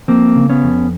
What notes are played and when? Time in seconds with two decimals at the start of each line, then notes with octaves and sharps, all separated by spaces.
0.08 F3 A#3 C4
0.36 C#3
0.50 B3 C#4
0.64 F2